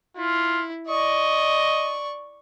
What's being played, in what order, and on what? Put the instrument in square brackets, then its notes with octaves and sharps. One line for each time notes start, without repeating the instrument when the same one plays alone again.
[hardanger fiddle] E4 [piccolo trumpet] F4
[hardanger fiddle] D5 C#6 [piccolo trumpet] D#5